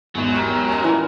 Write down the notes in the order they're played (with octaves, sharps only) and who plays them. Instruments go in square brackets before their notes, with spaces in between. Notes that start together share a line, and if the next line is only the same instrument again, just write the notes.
[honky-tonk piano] G#1 E2 [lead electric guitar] F#3
[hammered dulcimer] G4 A#4 B5
[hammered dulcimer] G#3 C#4 [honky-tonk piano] G#5 A#5
[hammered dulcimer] A#2 [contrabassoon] E3